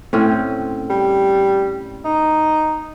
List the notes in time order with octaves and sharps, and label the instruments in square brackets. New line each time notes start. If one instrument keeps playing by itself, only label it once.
[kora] A2 C4 C#4
[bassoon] G3
D#4